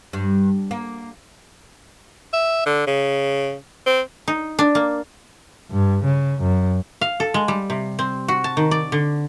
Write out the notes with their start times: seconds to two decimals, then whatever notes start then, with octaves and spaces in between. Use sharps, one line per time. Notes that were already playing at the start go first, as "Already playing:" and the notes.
0.13 G2
0.71 A#3
2.33 E5
2.66 D3
2.87 C#3
3.86 C4
4.28 D#4
4.59 D4
4.75 A#3
5.71 G2
6.05 C#3
6.42 F#2
7.01 F5
7.20 A4
7.34 G#3
7.48 G3
7.70 C3
7.99 C4
8.28 F#4
8.44 A5
8.57 D#3
8.71 D5
8.92 D3